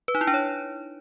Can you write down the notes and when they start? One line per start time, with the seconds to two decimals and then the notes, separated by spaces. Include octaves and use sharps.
0.08 B4
0.15 D#4
0.21 E4
0.27 D4
0.34 C#5